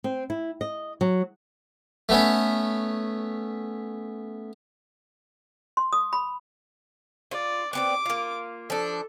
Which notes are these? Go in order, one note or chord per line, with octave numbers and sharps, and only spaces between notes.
C4
E4
D#5
F#3
A3 B3 C#4
C6
D#6
B5
F4 D5
B3 C4 D5 D6
A#3 F4
F3 D4 A4